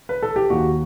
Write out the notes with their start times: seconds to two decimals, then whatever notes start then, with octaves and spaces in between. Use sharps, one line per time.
0.09 B4
0.23 A4
0.36 G4
0.50 D#2 D#3 F#4